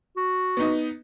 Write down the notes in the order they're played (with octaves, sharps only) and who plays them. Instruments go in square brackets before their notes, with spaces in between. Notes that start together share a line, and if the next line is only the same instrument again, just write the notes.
[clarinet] F#4
[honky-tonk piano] B3 D#4